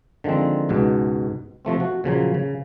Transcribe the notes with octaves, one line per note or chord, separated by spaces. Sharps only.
D3 D#3 F3 G#3 C4
C#2 G#2 B2
C3 F3 A3 C4
F#4
A#2 C#3 F3 F#3
C#3